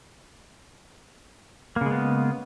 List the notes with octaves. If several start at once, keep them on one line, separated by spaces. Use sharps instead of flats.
C#3 G#3 A#3 B3